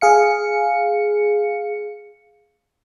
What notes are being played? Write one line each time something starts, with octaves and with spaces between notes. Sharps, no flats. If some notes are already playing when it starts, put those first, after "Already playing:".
G#4 F5 C#7